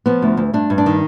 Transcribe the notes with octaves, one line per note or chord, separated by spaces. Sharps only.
F3 B3
D2
D2
G2 D4
G2
D4
D#3